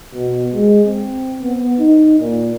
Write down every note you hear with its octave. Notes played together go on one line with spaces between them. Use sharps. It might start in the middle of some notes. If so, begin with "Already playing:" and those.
B2
G#3
C4
B3
D#4
A#2